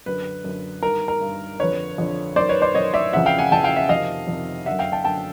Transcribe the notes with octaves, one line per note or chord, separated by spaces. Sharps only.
F#2 D3 B4
F#2 D3
G2 D#3 A#4
A#4
G2 D#3
F2 D3 B4 C#5
F2 D3
F#2 D#3 C5 D5
B4 C#5
C5 D5
F#2 D#3 C#5 D#5
D5 E5
F2 C#3 E3 E5 F#5
F5 G5
F#5 G#5
F2 C#3 E3 G5 A5
F5 G5
E5 F#5
F2 C3 D#3 D#5 F5
F2 C3 D#3
F#2 D3 E5 F#5
F5 G5
G5 A5
F#2 D3 G5 A5